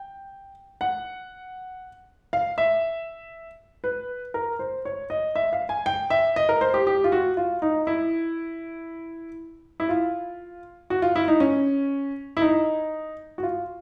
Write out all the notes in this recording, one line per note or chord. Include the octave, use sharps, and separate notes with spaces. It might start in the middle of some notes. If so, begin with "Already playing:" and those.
Already playing: G5
F#5
F5
E5
B4
A#4
C5
C#5
D#5
E5
F5
G#5
G5
E5
D#5
A#4
C5
G4
G4
F4
F#4
F4
D#4
E4
E4
F4
F#4
F4
E4
D#4
C#4
E4
D#4
F#4
F4